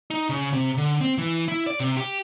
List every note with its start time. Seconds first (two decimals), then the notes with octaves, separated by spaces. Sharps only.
0.10 D#4
0.29 C#3
0.53 C3
0.77 D3
1.01 C4
1.18 E3
1.48 E4
1.67 D5
1.80 C3
1.97 G4